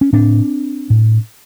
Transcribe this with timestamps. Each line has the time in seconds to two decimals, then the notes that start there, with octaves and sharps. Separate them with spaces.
0.01 C#4
0.13 A2 C4 D4
0.90 A2